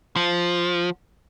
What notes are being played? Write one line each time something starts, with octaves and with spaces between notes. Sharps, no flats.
F3